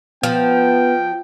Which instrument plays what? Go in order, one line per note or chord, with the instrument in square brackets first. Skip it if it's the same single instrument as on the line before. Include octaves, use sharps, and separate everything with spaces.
[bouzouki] F3 [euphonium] B3 [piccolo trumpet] G5